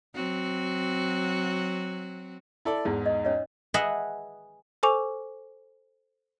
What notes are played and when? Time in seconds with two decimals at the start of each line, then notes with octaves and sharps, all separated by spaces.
0.15 F#3 C4 F#4
2.65 E4 A4 D5
2.85 E2 G#2 D#4
3.06 D#5
3.25 C#4 C#5 D#5
3.74 G#4 B4 D#5 E5 F#5
4.83 A4 C5 G#5 C#6 D6 F7